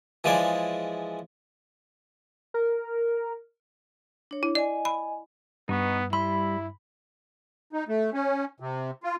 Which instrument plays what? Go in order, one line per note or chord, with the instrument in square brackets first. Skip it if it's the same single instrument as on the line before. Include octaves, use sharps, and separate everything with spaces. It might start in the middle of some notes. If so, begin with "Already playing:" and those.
[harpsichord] E3 F3 G#3 G#4 D5 D6
[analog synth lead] A#4
[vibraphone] D4 C#5
[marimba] E4
[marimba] D5 [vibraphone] D#5 G#5
[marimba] B5
[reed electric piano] G2 [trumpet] B3 [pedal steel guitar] D#4 C#6
[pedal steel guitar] G3 C6 E6 [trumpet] E4 [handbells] B5
[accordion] D#4
A3
C#4
C3
F4